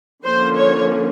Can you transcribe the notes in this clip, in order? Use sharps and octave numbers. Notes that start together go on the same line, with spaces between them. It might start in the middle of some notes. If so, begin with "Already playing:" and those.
D3 F3 A#3 C#4 C5
C#5